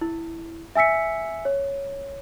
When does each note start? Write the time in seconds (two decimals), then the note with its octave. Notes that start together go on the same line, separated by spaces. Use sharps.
0.01 E4
0.76 E5 G#5 E6 B6 C#7
1.45 C#5